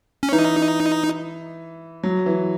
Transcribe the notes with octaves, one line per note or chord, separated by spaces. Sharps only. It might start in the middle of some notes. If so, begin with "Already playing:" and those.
C#4
E3 D#4
F#3
E3